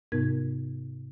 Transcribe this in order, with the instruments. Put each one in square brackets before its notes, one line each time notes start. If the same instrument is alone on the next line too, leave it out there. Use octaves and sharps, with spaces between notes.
[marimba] G#2 C3 B3 D#4 A#4 G#6